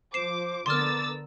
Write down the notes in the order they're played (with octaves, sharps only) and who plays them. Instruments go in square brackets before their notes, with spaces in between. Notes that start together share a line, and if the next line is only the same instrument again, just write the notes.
[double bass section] F3 [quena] C5 [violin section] D6 [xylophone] C7 E7
[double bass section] D3 B3 [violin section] A#4 E6 A6 [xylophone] C6 F6 [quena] D6